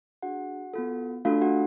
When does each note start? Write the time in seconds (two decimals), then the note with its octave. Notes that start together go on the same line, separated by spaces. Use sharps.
0.23 D4 F#4 G#4 F#5
0.74 B3 F4 A4
1.25 A3 D4 F4 F#4 A4 F5
1.42 F#4 F#5